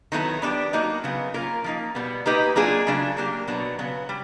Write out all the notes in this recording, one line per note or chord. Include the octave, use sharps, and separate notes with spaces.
D#3 F#3 B3 E4 A4
B3 D4 G4
F#3 A#3 D#4 F#4
C#3 F#3 B3
A#3 C#4 F4 A#4
F3 A#3 D#4
B2 G3 B3
A#3 D#4 G4 B4 D#5
F#3 A#3 D4 F4 G#4
C#3 F#3 A3 D4
F#3 A#3 D4 G4
B2 F#3 B3 D4
C#3 F#3 B3
G3